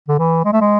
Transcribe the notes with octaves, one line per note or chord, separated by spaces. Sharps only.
D3
E3
G#3
A3
G#3